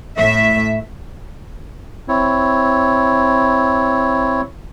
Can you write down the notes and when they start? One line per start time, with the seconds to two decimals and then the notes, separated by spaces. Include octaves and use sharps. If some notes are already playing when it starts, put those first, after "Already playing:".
0.17 A2 E5
2.08 C4 E4 C#5